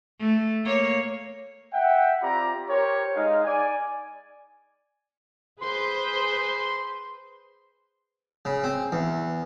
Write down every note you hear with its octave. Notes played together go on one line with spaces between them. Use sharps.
A3
A#3 C#5
E5 F#5 G5
C4 F4 G4 D5 A#5 B5
G4 A#4 C5 C#5
G#3 D#4 F5
D5 G#5
G#4 B4 C5 C6
C#3
C4
E2